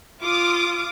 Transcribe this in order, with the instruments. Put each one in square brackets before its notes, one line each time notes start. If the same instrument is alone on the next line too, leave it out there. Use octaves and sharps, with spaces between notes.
[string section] F4 D6 D#6